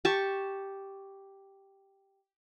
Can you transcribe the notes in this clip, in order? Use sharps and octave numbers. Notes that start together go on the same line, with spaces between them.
G4 A5 C#6